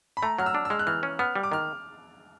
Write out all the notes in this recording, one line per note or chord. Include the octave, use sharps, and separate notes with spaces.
B5
A3 A#5
F#3 F6
E6
D4
E6
G#3 F6
F#6
E3 F6
C#4
B3 F6
G3
D6
D#3 F6